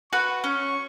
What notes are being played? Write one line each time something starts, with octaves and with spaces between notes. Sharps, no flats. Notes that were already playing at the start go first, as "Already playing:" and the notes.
F#4 B4 C#6
C#4 C#6